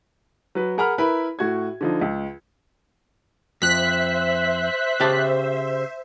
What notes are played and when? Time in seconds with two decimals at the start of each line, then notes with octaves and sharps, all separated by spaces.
0.55 F#3 B4
0.78 G#4 A#4 F#5 A#5 B5 F6
0.98 E4 A#4 B4 B5
1.39 A2 F#4 G#6
1.81 D3 F3 D#4
2.01 C#2
3.62 F2 C5 E5 F#6 B6
5.00 C#3 G4 A5